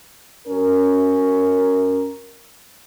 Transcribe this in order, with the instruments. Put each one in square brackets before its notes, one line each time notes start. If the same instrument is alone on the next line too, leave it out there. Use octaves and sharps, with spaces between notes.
[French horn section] F#2 C#4 A#4